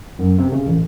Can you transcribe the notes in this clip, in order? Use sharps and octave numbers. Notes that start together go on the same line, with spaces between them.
F#2
C3
C#3
A1